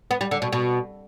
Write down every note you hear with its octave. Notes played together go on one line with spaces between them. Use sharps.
B3
G3
D3
B2
B2